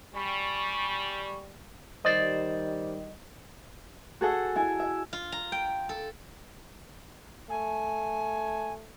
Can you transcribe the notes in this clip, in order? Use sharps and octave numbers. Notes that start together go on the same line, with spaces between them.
G3 G#5 B5 C#6
D#3 G3 C5 D5 D#5
F#4 G#4 A4 F#5 E6
E4 G#5
E5
F4
A#5
G5
A4
A3 G#5